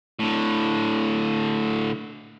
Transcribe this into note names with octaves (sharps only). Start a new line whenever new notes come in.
A2 D3